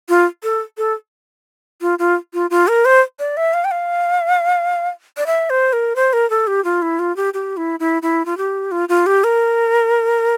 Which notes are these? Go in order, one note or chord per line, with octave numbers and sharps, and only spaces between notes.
F4
A4
A4
F4
F4
F4
F4
A#4
C5
D5
E5
F5
G5
F5
D5
E5
C5
A#4
C5
A#4
A4
G4
F4
E4
F4
G4
G4
E4
E4
E4
F4
G4
F4
F4
G4
A#4